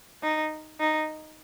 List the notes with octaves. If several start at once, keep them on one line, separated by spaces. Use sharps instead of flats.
D#4
D#4